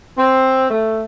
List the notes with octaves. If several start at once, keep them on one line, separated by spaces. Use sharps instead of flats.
C4
A3